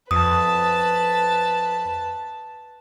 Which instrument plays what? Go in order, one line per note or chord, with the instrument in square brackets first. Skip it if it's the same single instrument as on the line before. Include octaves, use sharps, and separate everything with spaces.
[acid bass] F2 [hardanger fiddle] B4 A5 [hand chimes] D#6